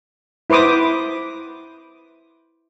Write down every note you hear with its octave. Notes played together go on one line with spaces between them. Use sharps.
E4 B4 C5 D6 D#6